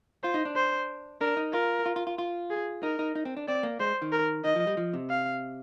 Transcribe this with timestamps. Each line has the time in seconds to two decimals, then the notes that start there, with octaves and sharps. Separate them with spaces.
0.23 F4 C5
0.34 D#4
0.45 D4
0.56 C5
1.21 D4 A#4
1.37 D#4
1.53 F4 A#4
1.86 F4
1.96 F4
2.07 F4
2.18 F4
2.50 G#4
2.83 D#4 A#4
2.99 D#4
3.15 D#4
3.25 C4
3.37 D4
3.48 C4 D5
3.63 A#3
3.80 G#3 C5
4.02 D#3
4.12 A#4
4.44 D#3 D#5
4.56 F3
4.67 G3
4.77 F3
4.93 C3
5.10 F5